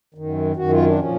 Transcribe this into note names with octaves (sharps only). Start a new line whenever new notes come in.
F#2 D#3
F#2 D#3 F#4
F4
D4
A#2 F3 C#4